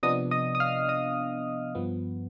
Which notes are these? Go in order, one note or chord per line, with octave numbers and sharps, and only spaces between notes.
C3 F3 B3 D4 D#5 D#6
D#5 D#6
D#6
F5 F6
D#5 D#6
G2 F3 B3